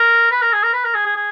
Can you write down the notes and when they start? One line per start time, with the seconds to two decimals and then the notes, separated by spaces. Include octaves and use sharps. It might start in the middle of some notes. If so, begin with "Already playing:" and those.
Already playing: A#4
0.31 B4
0.41 A#4
0.53 G#4
0.63 A#4
0.73 B4
0.84 A#4
0.94 G#4
1.06 G#4
1.16 G#4